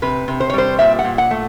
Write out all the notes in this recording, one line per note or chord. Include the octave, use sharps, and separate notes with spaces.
C3 B4
C3
C5
C#5
G3 C5
A#2 E5
F#5
A#2
F#5
A3